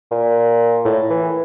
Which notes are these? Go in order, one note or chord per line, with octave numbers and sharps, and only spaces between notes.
A#2
A2
E3